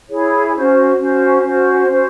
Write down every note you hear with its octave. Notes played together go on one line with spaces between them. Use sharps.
E4 G#4 C#5
C#4 F#4 C5
C#4 F#4 C5
C#4 F#4 C5
C#4 F#4 C5